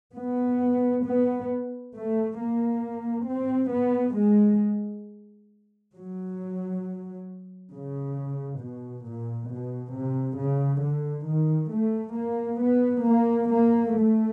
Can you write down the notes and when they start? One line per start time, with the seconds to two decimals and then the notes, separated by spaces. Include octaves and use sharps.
0.17 B3
1.07 B3
1.95 A3
2.40 A#3
3.29 C4
3.73 B3
4.17 G#3
5.96 F#3
7.73 C#3
8.61 B2
9.06 A#2
9.50 B2
9.95 C3
10.40 C#3
10.84 D3
11.28 D#3
11.73 A3
12.17 A#3
12.62 B3
13.06 A#3
13.50 A#3
13.95 A3